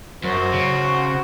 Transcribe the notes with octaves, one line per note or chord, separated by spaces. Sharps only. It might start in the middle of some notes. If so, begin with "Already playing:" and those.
F#2 F#4 C5
C#3